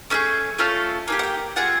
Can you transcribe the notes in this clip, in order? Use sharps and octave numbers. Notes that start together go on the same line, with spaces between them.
A3 C#4 E4 G#4
A3 C#4 F4 A4
A#3 D#4 G4 G#5
F#5
G5
C4 F4 G#4 F#5